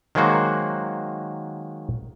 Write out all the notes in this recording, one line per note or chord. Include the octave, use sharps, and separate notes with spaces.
D#3 F#3 G#3 A#3 F#4 C5